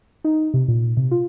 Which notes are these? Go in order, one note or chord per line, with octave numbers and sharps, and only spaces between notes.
D#4
C3
A#2
C3
F4